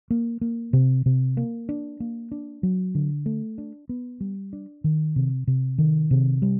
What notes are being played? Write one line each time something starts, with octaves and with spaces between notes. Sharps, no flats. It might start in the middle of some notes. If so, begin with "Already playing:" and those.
A#3
A#3
C3
C3
A#3
D4
A#3
D4
F#3
D3
A3
D4
B3
G3
D4
D#3
C3
C3
D#3
C3
G3